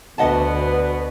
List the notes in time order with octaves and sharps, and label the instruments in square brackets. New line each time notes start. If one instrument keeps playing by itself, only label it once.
[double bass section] D2 [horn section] B2 D3 B3 [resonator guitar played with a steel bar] D#5 F#5 A5